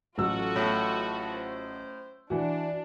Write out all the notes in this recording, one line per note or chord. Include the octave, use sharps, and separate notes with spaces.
A1 F#3 F4 F#4 A4 E6
A2
C5
E3 D4 F#4